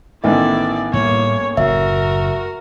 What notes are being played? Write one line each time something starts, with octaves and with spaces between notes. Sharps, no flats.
A1 D#3 B3 E4 D5 E5
A2 G3 A#3 C#5
F#1 A2 F#4 A#4 E5